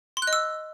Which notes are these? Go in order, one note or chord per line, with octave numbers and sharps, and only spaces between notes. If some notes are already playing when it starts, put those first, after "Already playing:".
C6
F#6
D#5
E6